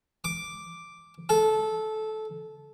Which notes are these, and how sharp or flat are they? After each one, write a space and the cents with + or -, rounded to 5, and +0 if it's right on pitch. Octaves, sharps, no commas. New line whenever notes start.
D6 +0
A4 -15